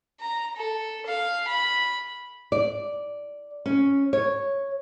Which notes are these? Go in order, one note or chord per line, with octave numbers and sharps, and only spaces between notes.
A#5
A4
F5
B5
D5
C#4
C#5